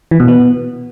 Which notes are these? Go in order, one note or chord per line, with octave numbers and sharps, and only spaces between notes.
E3
B2
B3